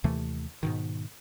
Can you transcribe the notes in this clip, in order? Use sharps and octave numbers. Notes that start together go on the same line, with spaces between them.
D#2 C3 E3 A3
G#2 B2 D#3